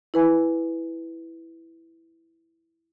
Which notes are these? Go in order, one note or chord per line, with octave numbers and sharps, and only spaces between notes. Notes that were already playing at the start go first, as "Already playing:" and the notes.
E4 B4 G#5